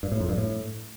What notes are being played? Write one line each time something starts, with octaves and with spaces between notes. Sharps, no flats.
G2
A2
F2
G2
A2